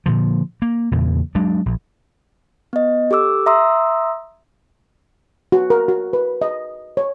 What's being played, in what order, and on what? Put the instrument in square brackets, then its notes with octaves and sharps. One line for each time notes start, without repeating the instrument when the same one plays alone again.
[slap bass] A#2 D3 F3
A#3
E2 A#2 C#3
F#3 G#3 D4
A#1
[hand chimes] B3 D#5
G4 A4 D6 E6
E5 A#5 C6 D#6 E6
[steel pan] F#4
A#4
F#4
B4
D#5
C#5